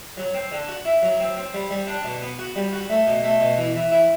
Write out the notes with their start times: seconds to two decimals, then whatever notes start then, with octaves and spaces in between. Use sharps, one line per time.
0.17 F#3
0.34 C4
0.52 D3
0.69 F#4
0.85 E4
1.02 F#3
1.20 C4
1.37 C4
1.54 G3
1.71 G3
1.87 D4
2.04 B2
2.22 B3
2.39 F#4
2.56 G3
2.73 F#4
2.89 A3
3.07 B2
3.24 A3
3.41 B2
3.58 E3
3.75 E3
3.92 E4